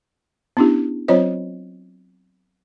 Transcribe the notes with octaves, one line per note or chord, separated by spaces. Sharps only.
B3 C#4 D4 E4 G4
F#3 C4 F4 C5 C#5 D#5